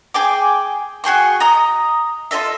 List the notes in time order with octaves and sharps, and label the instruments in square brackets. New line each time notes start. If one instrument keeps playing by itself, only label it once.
[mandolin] G#4 G5 D6
F#4 G#4 G5 C#6
D#5 A#5 D#6
F4 A4 D#5 E5